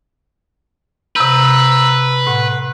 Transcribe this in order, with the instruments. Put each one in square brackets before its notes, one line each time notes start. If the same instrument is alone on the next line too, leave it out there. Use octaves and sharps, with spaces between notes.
[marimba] C3 G6 [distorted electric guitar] B4 [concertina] A#5 E6
[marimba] A2 [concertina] F#5